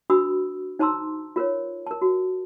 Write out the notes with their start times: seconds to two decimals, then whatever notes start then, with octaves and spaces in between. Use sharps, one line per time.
0.10 D4 F#4 B4 B5 D#6 E6
0.79 D#4 C5 A5 A#5 C6 E6
1.36 F4 A#4 C5 C#5
1.86 A#4 A5
2.02 F#4